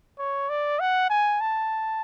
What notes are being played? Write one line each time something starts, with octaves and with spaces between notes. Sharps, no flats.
C#5
D5
F#5
G#5
A5